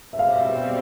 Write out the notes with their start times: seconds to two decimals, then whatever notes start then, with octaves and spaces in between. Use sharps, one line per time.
0.13 E5
0.19 B2 G3 C4 F5
0.36 E5
0.44 F5